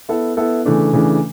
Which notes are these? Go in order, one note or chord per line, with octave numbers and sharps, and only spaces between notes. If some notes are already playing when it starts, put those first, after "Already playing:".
B3 E4 A4
B3 E4 A4
C#3 E3 A3 D4
C#3 E3 A3 D4